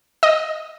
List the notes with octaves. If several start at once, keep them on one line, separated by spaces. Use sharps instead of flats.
D#5